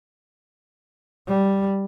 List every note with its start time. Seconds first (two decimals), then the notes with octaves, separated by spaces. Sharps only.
1.27 G3